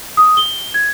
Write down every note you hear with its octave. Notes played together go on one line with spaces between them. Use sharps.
D#6
G7
G#6